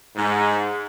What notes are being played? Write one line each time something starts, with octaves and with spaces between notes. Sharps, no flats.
G#2